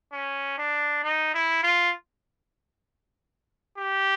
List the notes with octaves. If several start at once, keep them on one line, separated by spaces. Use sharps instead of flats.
C#4
D4
D#4
E4
F4
G4